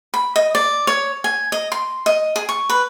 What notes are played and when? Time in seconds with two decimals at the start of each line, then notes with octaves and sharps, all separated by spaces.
0.14 B5
0.36 D#5
0.55 D5
0.87 C#5
1.24 G#5
1.52 D#5
1.72 C6
2.06 D#5
2.36 G#4
2.49 C#6
2.70 B4